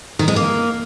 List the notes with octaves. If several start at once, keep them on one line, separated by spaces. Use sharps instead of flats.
D#3
G#3
A#3